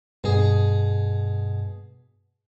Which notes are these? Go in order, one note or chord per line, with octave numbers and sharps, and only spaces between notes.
G2 B2 G#4